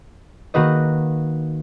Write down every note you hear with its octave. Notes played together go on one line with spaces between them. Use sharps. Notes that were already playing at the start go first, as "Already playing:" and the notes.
D#3 A#3 F#4 B4 D#5